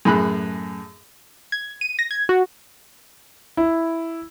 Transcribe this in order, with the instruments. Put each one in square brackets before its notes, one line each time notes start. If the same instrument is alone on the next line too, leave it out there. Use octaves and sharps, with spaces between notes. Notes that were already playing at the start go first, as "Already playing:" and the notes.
[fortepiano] F#2 A2 G#4 B5 F#6
[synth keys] G#6
D#7
A#6
G#6
F#4
[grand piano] E4